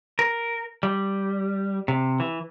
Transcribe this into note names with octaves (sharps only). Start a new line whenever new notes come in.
A#4
G3
C3
E3